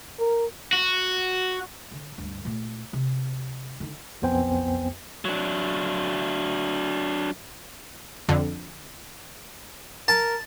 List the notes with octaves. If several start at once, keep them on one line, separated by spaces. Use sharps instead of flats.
A#4
F#4
D3
D2 G2
A#2 A3
C3
D3 D#4
B1 F2 B3 C5 G5 G#5
F#3 D4
F2 D3
A#4 A5